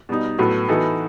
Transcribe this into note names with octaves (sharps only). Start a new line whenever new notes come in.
B2 G3 D#4
A2 F#3 B3 F#4 A4
E3 B3 D#4 F#4 A4